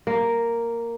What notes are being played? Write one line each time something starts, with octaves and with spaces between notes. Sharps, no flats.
A#3